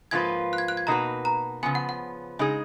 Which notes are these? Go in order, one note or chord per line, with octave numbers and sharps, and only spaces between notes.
G#2 F3 A#3 F4 B4 G#6
F#6
G#6
F#6
G#6
B2 A#3 D#4 F#4 B4 A#5
A#5
C#3 F3 B3 G#5
F#5
F#5
C#3 G#3 D#4 G#4